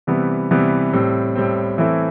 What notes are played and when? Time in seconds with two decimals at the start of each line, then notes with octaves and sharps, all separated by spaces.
0.07 C3 E3 G3 B3
0.51 C3 E3 G3 B3
0.93 A2 G3 C4
1.35 A2 G3 C4
1.78 E3 A3 C4 E4